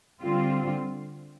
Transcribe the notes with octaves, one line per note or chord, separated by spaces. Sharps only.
D3 G3 C4 F4